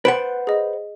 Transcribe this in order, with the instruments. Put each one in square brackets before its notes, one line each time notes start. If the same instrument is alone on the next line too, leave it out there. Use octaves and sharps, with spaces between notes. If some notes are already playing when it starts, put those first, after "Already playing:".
[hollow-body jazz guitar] B4 C5 F#5 [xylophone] D7
[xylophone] G#4 D#5